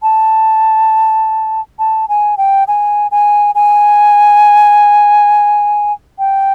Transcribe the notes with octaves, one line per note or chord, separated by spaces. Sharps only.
A5
A5
G#5
G5
G#5
G#5
G#5
G5